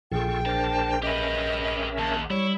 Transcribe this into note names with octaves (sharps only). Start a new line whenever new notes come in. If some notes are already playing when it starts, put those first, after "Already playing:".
A#1 F4 G#4 A4 G5 C#6
D4 A#4 C5 A5
C#4 G4 A#4 B4 D#5 E5
D#2 A5
G3 E4 C#5